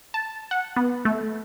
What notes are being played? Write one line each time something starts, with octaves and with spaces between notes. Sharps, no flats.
A5
F#5
B3
A3